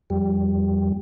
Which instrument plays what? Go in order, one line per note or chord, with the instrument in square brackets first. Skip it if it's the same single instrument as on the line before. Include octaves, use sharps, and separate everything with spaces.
[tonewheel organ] F2 G3